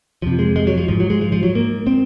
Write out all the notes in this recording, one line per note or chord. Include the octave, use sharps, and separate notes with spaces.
F2 C3 F3
G#3
G#3
F#3
F3
G#2 F3
F#3
G#3
F3
F3
F#3
G#2 A#3
C4